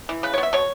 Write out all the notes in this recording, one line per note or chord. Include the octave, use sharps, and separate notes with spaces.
E3
C#3 B4
C#5
B3
E5
B2 C#5